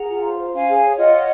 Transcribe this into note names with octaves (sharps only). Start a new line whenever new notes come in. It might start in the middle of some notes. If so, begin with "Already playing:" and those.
Already playing: G#4 F#5 A#5
F4
C5
C5
C#4 F5 G#5
G#4
C#5
F4 D#5 F#5
C#5